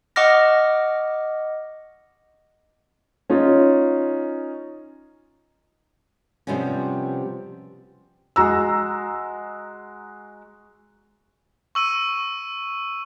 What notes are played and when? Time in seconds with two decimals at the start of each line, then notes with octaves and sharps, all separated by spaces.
0.16 D#5 F#5 C#6 D6 F6 A#6
3.30 C#4 D#4 F4
6.47 C3 F3 G3 B3 C#4
8.36 G#3 F#4 A#5 E6
11.75 C#6 E6 D#7